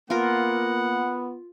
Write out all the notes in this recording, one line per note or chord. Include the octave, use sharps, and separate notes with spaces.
A#3 B3 F4 A#4 F#5